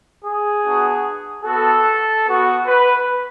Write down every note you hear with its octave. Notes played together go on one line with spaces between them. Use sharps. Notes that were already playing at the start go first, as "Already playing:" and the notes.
G#4
B3 D4 F#4
B3 F#4 A4
B3 F#4
B4